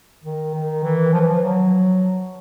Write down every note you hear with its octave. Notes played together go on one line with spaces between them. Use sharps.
D#3
D#3
E3
F3
E3
F3
F#3